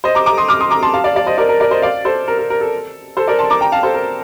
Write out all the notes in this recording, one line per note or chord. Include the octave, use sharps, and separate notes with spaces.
C5 D#5
A#5 D6
A#5 D6
C6 D#6
D6 F6
C6 D#6
A#5 D6
A5 C6
F5 A5
D5 F5
D5 F5
C5 D#5
A#4 D5
A#4
A#4 D5
C5 D#5
D5 F5
A4 C5
A#4
A#4
A#4
A4
A4 C5
A#4 D5
A5 C6
A#5 D6
G5 A#5
F5 A5
A4 C5
A#4